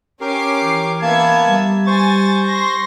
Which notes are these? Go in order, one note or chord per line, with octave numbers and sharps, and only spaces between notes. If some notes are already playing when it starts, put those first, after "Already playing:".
C#4 G4 A#4 D6 C7
E3
A#3 B3 E5 A5 G#6
G3
C5 G#5 C#6 A6
C6 A#6